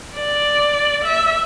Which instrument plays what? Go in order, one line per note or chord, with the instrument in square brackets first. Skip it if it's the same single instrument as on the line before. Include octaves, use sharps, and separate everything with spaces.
[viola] D5
E5